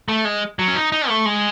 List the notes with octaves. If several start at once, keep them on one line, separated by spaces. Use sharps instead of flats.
A3
G#3
F#3
C#4
D#4
D#4
A3
G#3